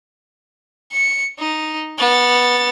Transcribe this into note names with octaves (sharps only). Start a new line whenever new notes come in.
C#7
D#4
B3 A6